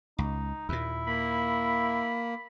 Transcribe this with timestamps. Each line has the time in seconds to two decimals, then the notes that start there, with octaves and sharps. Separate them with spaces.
0.19 C#2 D#4
0.69 D#2 A#2 E4
1.07 A#3 B5